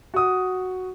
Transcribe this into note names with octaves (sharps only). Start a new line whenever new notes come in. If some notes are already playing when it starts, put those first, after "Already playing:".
F#4 D#6